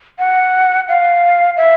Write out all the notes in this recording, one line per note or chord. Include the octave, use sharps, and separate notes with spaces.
F#5
F5
E5